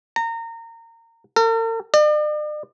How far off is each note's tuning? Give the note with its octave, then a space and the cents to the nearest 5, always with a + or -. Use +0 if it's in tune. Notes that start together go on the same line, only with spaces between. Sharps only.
A#5 -25
A#4 -45
D5 +45